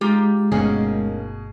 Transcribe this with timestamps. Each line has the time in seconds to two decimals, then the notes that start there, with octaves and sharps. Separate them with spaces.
0.01 G#3 D#4 F4 G4
0.52 G1 B2 D3 D#3 A3 A#3 C#4 G#4